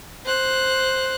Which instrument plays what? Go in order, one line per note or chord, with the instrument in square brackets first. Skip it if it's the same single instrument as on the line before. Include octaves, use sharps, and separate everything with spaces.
[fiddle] C5 F#6